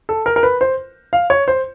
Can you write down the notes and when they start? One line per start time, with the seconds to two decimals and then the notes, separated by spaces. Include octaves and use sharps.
0.09 A4
0.26 A#4
0.36 A#4
0.43 B4
0.61 C5
1.13 F5
1.30 C#5
1.48 C5